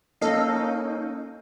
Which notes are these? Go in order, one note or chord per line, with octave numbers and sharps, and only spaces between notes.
A#3 C#4 D#4 A4 D#5 F5